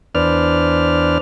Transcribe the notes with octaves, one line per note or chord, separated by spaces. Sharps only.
E2 D4 B4 C5 D5 F6